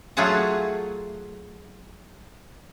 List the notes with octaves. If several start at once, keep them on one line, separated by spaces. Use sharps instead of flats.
F#3 A3 F4 F#4 G#4 F#5